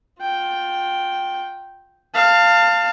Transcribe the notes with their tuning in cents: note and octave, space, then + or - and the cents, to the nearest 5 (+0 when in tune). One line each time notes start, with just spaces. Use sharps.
F4 +25 G5 -5
F5 +0 A5 +30